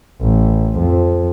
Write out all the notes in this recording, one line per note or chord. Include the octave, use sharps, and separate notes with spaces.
A1
F2